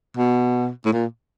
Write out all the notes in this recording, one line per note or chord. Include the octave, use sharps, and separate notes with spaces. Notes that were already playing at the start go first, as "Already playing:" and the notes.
B2
A2
A#2